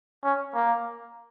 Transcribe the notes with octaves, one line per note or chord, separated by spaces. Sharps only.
C#4
A#3